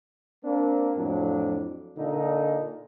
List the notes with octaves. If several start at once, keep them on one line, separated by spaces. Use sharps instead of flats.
A#3 C4 D4
F2 A2 F#3 D4
A#2 D3 D#4